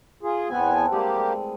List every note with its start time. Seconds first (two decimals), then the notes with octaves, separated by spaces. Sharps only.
0.23 F4 G#4
0.50 E2 B3 C4 B4 F#5 G#5
0.70 A4 A#4
0.92 G3 G#3 A#3 E4 G4
1.16 G#3 A3